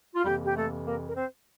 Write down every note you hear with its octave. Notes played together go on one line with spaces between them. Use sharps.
F4
F2 C3 E3 G3 A#3 G4
G4
A3 A4
A#3 A#4
A#4
C4 C5